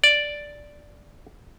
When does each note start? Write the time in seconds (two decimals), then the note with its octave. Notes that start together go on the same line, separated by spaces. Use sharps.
0.04 D5